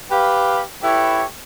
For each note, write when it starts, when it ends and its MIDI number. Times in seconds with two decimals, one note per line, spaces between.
0.11 0.60 67
0.11 0.60 71
0.11 0.60 77
0.83 1.23 64
0.83 1.23 67
0.83 1.23 69
0.83 1.23 71
0.83 1.23 73
0.83 1.23 76